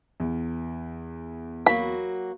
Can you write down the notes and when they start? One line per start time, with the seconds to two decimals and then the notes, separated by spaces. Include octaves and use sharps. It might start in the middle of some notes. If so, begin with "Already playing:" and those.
0.20 E2
1.66 F#3 A#3 F#4 B5